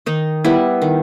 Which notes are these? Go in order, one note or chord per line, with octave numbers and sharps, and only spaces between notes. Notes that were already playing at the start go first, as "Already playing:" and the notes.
D#3 D#4
G3 B3 E4
D#3